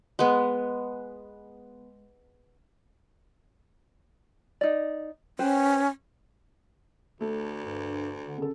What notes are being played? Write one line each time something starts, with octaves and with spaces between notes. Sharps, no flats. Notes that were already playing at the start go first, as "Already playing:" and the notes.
G#3 B3
D#4 D5
C#4 B4 C5 G5
D2 A3
G2
D3
C#3 A4